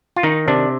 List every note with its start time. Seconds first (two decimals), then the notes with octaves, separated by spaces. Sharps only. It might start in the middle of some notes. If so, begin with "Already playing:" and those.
0.16 F4
0.23 D#3 D#4
0.48 C3 D4